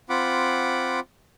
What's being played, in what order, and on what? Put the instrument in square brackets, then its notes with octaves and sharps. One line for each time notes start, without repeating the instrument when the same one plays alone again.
[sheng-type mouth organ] C4 F4 F#5 B5 D6